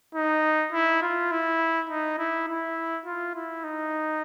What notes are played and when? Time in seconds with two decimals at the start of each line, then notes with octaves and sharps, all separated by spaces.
0.15 D#4
0.73 E4
1.02 F4
1.32 E4
1.90 D#4
2.19 E4
2.48 E4
3.06 F4
3.35 E4
3.64 D#4